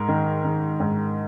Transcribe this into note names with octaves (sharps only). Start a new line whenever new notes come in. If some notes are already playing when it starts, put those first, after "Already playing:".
Already playing: G#2 A#4
D#3
D#3
G#2